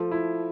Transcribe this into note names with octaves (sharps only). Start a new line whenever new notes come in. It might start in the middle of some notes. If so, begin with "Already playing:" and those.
Already playing: F3 A3
E4